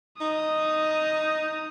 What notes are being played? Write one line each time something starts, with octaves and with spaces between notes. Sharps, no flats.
D#4 D#6